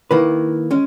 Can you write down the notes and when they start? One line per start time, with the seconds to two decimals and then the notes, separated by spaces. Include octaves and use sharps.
0.11 D#3 A#3 E4 B4
0.71 G#3 C#4